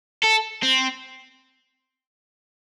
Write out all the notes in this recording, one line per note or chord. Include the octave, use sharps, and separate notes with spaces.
A4
C4